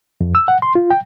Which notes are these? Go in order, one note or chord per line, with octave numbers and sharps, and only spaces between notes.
F2
E6
F#5
C6
F4
G5